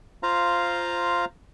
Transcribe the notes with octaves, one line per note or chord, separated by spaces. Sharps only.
F4 C5 F5 A#5